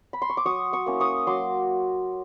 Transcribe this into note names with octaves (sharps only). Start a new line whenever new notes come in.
B5
C6
C#6
D6
F#3 C#6 D#6
C#6 D#6
A#3 C#4 E4
C#6 D#6
F#3 C6 D6